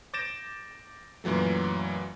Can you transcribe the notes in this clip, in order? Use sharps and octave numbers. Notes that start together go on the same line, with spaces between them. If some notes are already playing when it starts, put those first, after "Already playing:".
D6 G6 A6 A#6 D7 E7
F#2 A#2 E3 F#3 A3